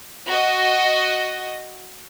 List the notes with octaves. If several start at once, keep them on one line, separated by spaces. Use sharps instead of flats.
F#4 D#5